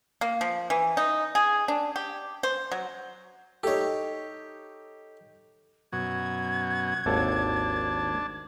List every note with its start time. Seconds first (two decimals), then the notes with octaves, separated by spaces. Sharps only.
0.21 A#3
0.41 F3
0.70 E3
0.97 D#4
1.35 G#4
1.68 D4
1.96 G4
2.43 C5
2.71 F#3
3.63 D#4 G4 A4 C#5
5.92 F#2 B2 F#4 G#6
7.06 G#1 D#2 D4 A4 A5